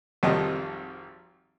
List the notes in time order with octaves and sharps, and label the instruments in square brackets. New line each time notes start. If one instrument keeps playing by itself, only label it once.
[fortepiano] G#1 F2 D#3 G3 D#5 A5